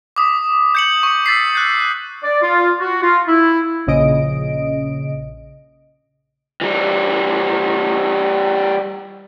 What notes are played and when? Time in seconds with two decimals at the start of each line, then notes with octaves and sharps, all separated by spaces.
0.16 D6 D#6 B6
0.75 G6 C#7 F#7
1.03 C#6 C#7
1.26 E6 A6 B6 C7
1.55 F#6 G6
2.24 D5
2.43 F4
2.80 F#4
3.03 F4
3.28 E4
3.87 A#1 C#3 D#5 D7
6.61 E3 G3